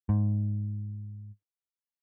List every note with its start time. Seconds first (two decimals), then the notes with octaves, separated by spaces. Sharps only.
0.09 G#2